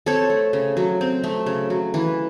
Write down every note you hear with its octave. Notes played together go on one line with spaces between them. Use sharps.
C4 A4 C#5
A3
C#3
F#3
C4
A3
C#3
F#3
E3